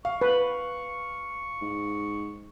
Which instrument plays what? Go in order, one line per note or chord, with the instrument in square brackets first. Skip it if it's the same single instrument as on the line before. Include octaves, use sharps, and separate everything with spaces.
[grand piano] F5 [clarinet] C#6
[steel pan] B4
[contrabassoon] G#2